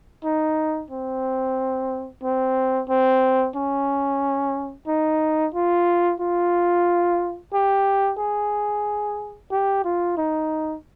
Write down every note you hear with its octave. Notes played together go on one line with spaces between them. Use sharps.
D#4
C4
C4
C4
C#4
D#4
F4
F4
G4
G#4
G4
F4
D#4